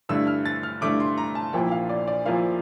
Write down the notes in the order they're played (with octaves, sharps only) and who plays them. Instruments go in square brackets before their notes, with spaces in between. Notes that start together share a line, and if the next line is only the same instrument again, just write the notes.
[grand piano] G2 D3 A3 E4 E6
F6
A6
F6
G2 D3 A3 E4 D6
C6
A#5
A5
A#1 A#2 F3 A#3 E4 G5
F5
D5
D5
A#1 A#2 F3 A#3 E4 F5